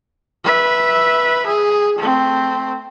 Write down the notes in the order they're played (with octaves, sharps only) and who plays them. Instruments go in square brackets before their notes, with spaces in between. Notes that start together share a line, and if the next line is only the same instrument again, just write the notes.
[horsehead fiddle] B4 E5
G#4
A3 C4